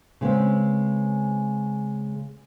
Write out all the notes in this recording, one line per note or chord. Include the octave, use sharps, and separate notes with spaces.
C#3 G#3 B3 C4